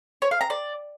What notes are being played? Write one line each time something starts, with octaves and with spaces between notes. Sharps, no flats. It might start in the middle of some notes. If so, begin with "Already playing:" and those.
C#5
F5
A#5
D5